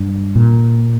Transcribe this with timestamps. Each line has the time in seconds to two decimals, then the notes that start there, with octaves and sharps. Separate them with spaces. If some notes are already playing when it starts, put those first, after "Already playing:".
Already playing: G2
0.36 A#2